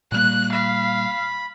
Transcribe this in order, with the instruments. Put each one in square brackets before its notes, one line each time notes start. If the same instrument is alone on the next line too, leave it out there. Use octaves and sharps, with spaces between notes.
[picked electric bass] A#2 G3 A#3 [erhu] F#6
[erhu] F5 [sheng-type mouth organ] B5